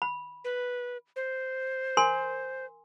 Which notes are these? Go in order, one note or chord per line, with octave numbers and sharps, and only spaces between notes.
B5
B4
C5
A#4 G#5 C6